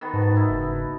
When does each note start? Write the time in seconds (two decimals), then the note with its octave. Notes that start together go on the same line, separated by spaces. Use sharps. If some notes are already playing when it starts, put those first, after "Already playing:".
0.01 D#3 B3 F#4
0.13 G#2 A5
0.36 D#4 E4
0.49 F#1